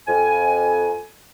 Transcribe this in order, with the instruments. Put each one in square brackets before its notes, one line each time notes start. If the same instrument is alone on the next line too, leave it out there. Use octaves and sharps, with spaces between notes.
[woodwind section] F2 G#5